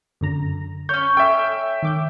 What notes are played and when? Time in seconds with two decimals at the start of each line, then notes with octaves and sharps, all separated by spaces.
0.21 F#2 D3 A#5
0.89 C#4 C#5 G6
1.17 A4 E5 G5
1.82 D#3 D6 G6